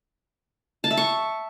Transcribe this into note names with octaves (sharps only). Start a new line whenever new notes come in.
A5
E5
C#6